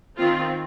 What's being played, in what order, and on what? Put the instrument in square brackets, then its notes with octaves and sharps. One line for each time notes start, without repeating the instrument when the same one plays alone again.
[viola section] D#3 C4 F4